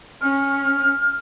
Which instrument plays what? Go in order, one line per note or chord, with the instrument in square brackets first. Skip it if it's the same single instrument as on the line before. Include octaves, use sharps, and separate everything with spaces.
[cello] C#4 [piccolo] F6